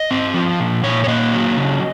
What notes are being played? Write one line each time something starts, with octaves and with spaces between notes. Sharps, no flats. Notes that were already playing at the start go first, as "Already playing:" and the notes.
Already playing: D#5
C4
F3
A#2
A#2 C#5
C#5
A#3 D#5
F#3
C#3